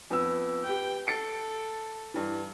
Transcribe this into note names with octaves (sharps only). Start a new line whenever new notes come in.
F2 B3 E6
G4 B4 G5
A4 A6 C#7 D7
G2 E3